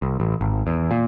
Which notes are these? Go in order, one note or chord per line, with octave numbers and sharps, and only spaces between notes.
C2
A1
G#1
E2
A#2